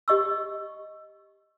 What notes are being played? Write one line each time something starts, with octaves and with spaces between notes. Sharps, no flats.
G4 D#5 C#6 E6